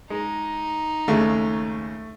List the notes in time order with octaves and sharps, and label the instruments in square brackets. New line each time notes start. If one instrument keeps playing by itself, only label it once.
[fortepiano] G#3 [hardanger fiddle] D#4
[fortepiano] D#2 C#3 G#3 [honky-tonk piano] A3